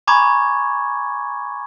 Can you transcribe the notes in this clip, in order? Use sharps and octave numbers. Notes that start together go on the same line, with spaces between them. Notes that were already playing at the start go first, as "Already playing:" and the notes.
G#5 A#5 B5 C#6 D6 G#6